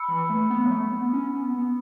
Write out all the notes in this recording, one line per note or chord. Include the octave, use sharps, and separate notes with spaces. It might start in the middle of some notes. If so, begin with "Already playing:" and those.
Already playing: B5 E6 C#7
E3
A3
B3
F#3
A3
B3
C#4
B3
B3